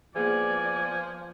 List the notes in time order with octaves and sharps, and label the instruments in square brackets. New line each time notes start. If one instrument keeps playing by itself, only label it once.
[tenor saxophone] F3 [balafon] A#3 G#4 [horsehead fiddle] B3 D5 [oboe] G#5